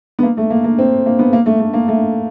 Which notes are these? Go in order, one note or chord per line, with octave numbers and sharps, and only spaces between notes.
B3
A#3
A3
A#3
A#3
C4
A#3
B3
A#3
A3
A3
A#3
A3